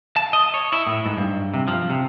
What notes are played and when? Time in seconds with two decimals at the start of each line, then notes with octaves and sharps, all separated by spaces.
0.16 A5
0.33 D#5
0.54 C#5
0.72 E4
0.87 A2
1.06 G#2
1.18 G2
1.54 C3
1.68 F3
1.90 C3